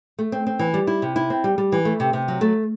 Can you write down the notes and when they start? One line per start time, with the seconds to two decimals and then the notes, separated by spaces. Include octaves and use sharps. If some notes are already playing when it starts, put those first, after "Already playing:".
0.19 A3
0.32 C4
0.47 C4
0.59 E3
0.74 G3
0.87 E4
1.02 C3
1.16 E4
1.30 C4
1.44 G3
1.58 G3
1.72 E3
1.85 A3
2.00 C3
2.13 C3
2.28 F#3
2.41 A3